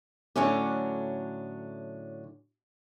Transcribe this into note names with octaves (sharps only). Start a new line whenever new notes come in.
A2 D3 F#3 C#4 D4